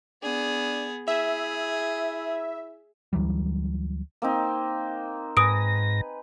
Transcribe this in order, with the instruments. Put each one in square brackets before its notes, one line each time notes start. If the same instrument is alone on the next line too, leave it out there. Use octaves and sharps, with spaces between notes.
[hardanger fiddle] B3 G#4 [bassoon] D4
[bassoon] E4 [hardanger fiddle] G#4 [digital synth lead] E5
[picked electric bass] D2 E3 F#3 G3
[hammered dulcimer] A#3 C4 D#4
[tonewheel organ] G#2 A#6 [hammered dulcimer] B4 G#5 [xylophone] D#6 D7